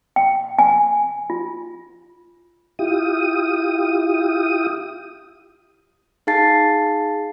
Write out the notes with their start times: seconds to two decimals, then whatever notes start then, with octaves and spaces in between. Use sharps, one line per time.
0.16 G5
0.59 G#5
1.30 F4
2.79 E4 F4 G4 D#6
6.27 D#4 G#4 F5 A5 A6 C7